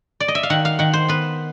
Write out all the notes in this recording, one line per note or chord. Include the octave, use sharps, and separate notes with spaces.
D5
D#5
E5
F5
D#3 F#5
F5
D#3 F#5
C5
B3 B4